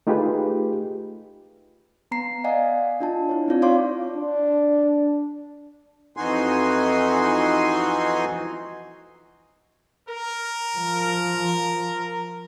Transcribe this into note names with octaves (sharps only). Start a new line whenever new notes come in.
A3 D#4 F4 G4 G#4 B4
B3 A#5 C7
D5 D#5 F5 F#5 G#5
D4 F4 A5
E4 C#5
C4 D#4 F4 D5
C#5 D5 F5 C6 D6
D4
F2 E3 D#4 F#4 G#5 C6
A#4
F3